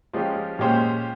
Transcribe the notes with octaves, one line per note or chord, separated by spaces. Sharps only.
F3 G#3 C#4 G4
A#2 G#3 C#4 G4 C5